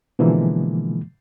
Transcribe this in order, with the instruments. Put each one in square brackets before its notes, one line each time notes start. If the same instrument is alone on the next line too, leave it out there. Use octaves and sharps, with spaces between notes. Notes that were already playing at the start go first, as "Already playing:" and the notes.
[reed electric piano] B2 D3 E3 F3 G#3 A#3